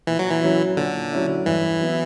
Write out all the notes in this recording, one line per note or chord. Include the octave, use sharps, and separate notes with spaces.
A#2 E3
F#3
E3
F#3 C#4 E4
A#2 D3
F#3 C#4 E4
G2 E3
F#3 B3 E4